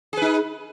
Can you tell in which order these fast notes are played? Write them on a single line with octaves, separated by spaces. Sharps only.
G#4 B4 D#4